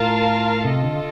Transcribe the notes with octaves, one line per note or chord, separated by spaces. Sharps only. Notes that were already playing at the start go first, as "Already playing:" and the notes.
Already playing: A2 F4 A#4 F5 A5
C3 F4 A4 D#5
D3